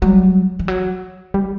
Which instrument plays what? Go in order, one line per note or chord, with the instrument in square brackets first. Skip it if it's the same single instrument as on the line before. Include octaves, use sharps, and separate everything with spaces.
[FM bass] F#3 [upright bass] G3
[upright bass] E3
F#3
[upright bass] E3 [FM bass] G3